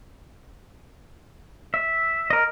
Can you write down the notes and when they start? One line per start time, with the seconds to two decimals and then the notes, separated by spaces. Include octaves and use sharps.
1.74 E5
2.30 A#4 D#5